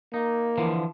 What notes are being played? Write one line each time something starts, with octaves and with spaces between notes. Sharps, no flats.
A#3 D#4
D3 E3 F3